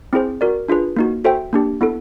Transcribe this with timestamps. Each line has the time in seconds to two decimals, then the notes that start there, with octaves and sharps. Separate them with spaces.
0.13 C4 E4 G#4 C5
0.41 F#4 A#4 D5
0.68 D4 F4 G#4 B4
0.96 A#3 D#4 F#4
1.24 F#4 A4 C5 E5 G5
1.53 A#3 D4 G4
1.81 B3 E4 A4